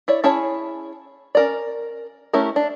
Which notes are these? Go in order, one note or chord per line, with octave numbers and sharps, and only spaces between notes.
E4 C#5 D5
C#4 E4 G#4 C#5 A5
C#4 A#4 D5
A3 C#4 E4 G4 A#4
D4